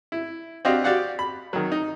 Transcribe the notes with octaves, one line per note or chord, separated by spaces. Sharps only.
E4
C4 D4 F#4 G4 D#5 F5
F#4 G4 D5 F5 F#5
B5
D#3 F#3
D#4